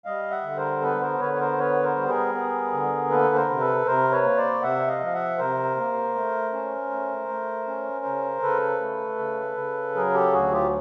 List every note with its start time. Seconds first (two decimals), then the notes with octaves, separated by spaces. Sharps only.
0.05 G3 D#5 F5
0.31 E5 F#5
0.43 D3
0.57 A#4 C5
0.81 B3 A4 B4
1.01 A#4 C5
1.20 D3 B4 C#5
1.34 C#5
1.39 A#4 C5
1.58 B3 B4 C#5
1.83 A#4 C5
1.97 G3
2.08 G#4 A#4
2.34 B3
2.72 D3
3.10 A#3 A4 B4
3.35 A#4 C5
3.49 C3
3.60 A4 B4
3.86 C3 A#4 C5
4.12 B4 C#5
4.24 A#3
4.37 C5 D5
4.62 C3 E5 F#5
4.87 D#5 F5
5.00 F3
5.06 F5
5.13 E5 F#5
5.38 C3 A#4 C5
5.77 A#3
6.15 A3
6.53 C#4
6.91 A3
7.29 A3
7.68 C#4
8.05 C#3
8.42 C#3 A4 B4
8.81 A3
9.19 C#3
9.57 C#3
9.95 F#3 G#4 A#4
10.14 G4 A4
10.33 D2 F#4 G#4
10.52 F4 G4